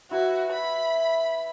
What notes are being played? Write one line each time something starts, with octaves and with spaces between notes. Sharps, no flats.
E4 F#4 B4
B5